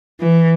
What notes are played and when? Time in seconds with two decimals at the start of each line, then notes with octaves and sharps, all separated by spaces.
0.20 E3